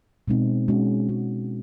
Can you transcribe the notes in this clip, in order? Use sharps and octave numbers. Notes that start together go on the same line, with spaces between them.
B2 G#3 C4 D#4
G#3 C#4 F#4
G#3 C#4 F#4